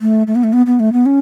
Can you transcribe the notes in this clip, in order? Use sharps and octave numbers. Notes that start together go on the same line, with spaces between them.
A3
A3
B3
A3
B3
B3
A3
B3
C#4